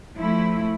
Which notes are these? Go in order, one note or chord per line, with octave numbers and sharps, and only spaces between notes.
F3 A3 E4